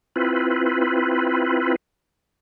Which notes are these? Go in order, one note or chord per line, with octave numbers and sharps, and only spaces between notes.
C4 E4 F4 B4